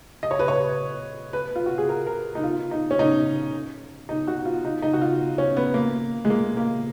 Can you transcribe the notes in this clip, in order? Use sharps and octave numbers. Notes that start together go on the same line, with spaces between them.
D#5
C#5
B4
C#5
B4
F4
F#4
G#4
A#4
A#4
D#4
F4
D#4
C#4
D#4
D#4
F#4
F4
D#4
D#4
F#4
F4
C#4
B3
A#3
G#3
A#3
A#3